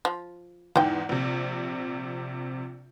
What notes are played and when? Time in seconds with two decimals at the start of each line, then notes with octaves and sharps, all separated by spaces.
0.05 F3
0.76 E2 G#2 E3 G5
1.09 A#1 C3